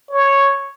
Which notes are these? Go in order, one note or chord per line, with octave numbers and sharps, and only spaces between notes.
C#5